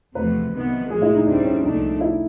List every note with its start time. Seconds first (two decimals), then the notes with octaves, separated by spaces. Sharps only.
0.15 E2 C3 F3 A3 B4
0.52 C2 C3 D#3 F#3 B3
0.89 A2 F3 G#3 G#4
1.02 E4
1.14 D#4
1.26 D2 D3 G3 C4 D4
1.45 C#4
1.63 C2 A#2 F3 A3 D4 D#4
2.01 E4